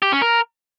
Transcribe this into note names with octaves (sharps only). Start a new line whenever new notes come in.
G4
C#4
A#4